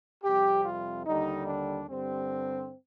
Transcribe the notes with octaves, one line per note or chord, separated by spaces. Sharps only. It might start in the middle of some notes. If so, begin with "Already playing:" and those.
F2 C3 G3 G4
F4
D#2 D3 G3 D#4
D4
G2 D3 G3 C4